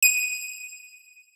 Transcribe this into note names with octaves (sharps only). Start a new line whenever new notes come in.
D#7